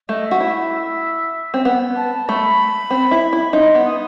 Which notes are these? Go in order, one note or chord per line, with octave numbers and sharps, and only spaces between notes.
A3 D#5
E5
F#4
E4
C4
B3
A5
A3 B5
C4
E4
E4
D#4 C6
B3
D#6